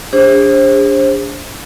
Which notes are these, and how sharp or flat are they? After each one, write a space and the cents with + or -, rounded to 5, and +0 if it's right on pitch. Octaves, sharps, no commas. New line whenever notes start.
D4 -25 G#4 -40 C5 +30